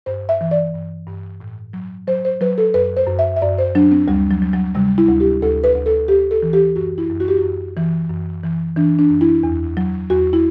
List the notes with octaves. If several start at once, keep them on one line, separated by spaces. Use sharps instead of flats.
G2 C5
E5
E3
D5
G2
G2
A2
F#3
F#3 C5
C5
F#3 B4
A4
F#2 B4
C5
F#2
E5
E5
F#2 D5
C5
F#3 D4
C4
D2 G3
F#3
F#3
F#3
C3 G3
E4
D2
G4
D2 A4
B4
D2
A4
D2 G4
A4
E3
G4
F#2 F#4
E4
F#2
F#4
G4
F#4
F#2
E3
F#2
E3
E3 D4
D4
F#2
E4
E2
F#3
E2 F#4
E4